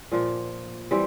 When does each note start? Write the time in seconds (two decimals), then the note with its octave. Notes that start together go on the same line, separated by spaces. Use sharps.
0.12 A#2 F3 A#3
0.91 E3 G3 C4